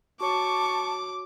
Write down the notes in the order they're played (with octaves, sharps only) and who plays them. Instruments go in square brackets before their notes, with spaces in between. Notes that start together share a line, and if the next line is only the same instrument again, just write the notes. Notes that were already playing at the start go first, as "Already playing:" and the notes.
[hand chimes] F#4 C#5 [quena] A5 [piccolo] C#6 [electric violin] D6